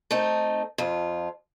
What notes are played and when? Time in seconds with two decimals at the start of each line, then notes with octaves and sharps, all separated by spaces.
0.11 A3 C4 D#4
0.78 F2 F4